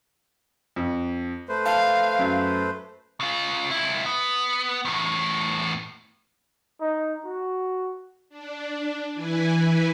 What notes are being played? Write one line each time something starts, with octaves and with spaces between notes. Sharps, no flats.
F2
A3 B4 C5
F5 A5
F#2
C#3 F4
C#2 E4
B3
E2 A2
D#4
F#4
D4
E3 E4 B4 G#5